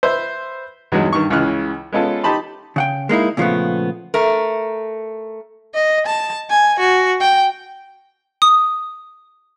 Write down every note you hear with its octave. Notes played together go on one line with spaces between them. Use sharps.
B4 C5 E5
E2 G2 F#3 G#3 D#4 F#4
G2 D#3 C#6
C#2 C#3 E3 F6 F#6
G#3 B3 C#4 F4 A4
D#4 G4 A5 B5 C6
C#3 F#5 G5
G#3 A#3 D#4 E4
A#2 C#3 F3 G3 A3 B3
A3 A#4
D#5
A5
G#5
F#4
G5
D#6